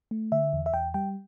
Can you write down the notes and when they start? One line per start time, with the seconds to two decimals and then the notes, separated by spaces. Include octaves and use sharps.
0.11 A3
0.32 D3 E5
0.53 E2
0.66 E5
0.74 E2 G5
0.94 G3 G5